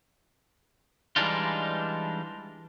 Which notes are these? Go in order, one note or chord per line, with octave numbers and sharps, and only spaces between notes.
E3 G3 G#3 D4 D#4 F4